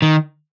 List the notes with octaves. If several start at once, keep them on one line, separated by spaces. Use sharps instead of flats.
D#3